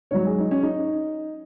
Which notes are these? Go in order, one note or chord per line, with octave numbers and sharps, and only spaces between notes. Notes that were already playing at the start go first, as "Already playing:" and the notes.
G#2 F#3 C#5
G#4
D#4
C#4
D#4